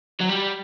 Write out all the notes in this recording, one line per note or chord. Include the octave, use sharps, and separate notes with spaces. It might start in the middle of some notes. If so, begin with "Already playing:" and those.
F#3
G3